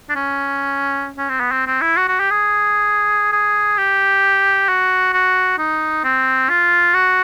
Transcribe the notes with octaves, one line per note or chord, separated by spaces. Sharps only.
D4
C#4
C#4
C4
B3
C4
C4
E4
F#4
F#4
G4
G#4
G#4
G4
F#4
F#4
D#4
C4
F4
F#4